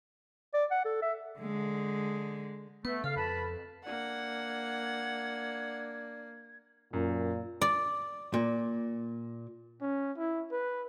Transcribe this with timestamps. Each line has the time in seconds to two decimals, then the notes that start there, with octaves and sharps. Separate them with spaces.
0.54 D5
0.71 F#5
0.85 A4
1.02 E5
1.40 D3 G#3
2.85 A3 B3 B4
3.04 C#3 A4 F5
3.16 F2 B4 A5 B5
3.86 A#3 D4 F#5 G#6
6.93 F#2 A#2
7.61 D5
8.34 A#2
9.81 C#4
10.18 E4
10.52 B4